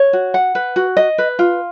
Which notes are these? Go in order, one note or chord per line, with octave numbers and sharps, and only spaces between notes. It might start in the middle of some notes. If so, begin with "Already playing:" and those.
Already playing: C#5
F#4
F#5
B4
F#4
D#5
B4
F4